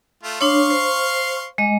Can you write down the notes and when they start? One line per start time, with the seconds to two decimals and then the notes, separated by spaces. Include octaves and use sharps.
0.23 A3 F4
0.41 D4 C#5 F5 C6 C#6
0.70 C5
1.58 G#3 D#5